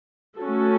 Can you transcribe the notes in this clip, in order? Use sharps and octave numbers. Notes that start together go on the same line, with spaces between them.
A3 C#4 F#4 A4